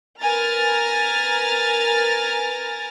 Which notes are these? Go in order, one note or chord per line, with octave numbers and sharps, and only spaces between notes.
A#4 B4 G#5 A#5 F6 A6